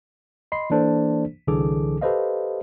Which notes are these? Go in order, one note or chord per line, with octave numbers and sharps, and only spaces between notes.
D#5 B5 C6 C7
E3 A#3 D4 A4 C5
C2 D3 E3 G#4 A4 D6
G4 A4 B4 C5 D#5 F5